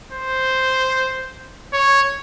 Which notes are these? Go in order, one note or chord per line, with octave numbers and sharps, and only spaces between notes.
C5
C#5